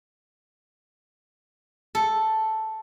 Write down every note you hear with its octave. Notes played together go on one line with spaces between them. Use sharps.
A4